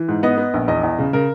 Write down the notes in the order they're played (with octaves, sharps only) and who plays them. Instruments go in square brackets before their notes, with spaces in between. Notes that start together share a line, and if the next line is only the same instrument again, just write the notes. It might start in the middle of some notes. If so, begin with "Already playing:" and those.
Already playing: [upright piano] E3
G#2
B3 D#5
B3
A#1
E2 D#5
E2
C#3
C#3 A#4